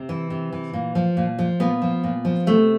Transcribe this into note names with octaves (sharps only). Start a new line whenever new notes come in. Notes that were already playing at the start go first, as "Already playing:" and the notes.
Already playing: C3
E3
C3
E3
A#2
F3
A#2
F3
A#2 B3
F3
A#2
F3
C3 A3